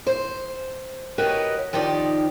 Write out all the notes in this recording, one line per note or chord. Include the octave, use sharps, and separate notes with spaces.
C5
F#4 G4 A#4 B4 C#5 D#5
D#3 F3 D#4 G4 D5